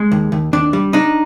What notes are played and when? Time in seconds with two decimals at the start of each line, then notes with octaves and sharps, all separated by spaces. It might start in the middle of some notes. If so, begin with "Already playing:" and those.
Already playing: G#3
0.12 D#2
0.32 D#2
0.53 D#2 D4
0.73 G3
0.93 D4 D#4